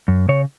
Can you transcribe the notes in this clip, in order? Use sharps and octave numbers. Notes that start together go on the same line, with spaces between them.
F#2
C#3 C#5